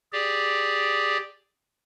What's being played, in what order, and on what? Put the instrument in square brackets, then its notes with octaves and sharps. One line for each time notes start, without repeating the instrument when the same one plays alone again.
[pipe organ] G4 G#4 D5